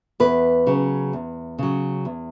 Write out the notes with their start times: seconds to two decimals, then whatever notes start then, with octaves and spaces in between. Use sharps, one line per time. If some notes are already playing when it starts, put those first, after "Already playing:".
0.20 E2 B4
0.67 C#3 F#3
1.13 E2
1.59 C#3 F#3
2.05 E2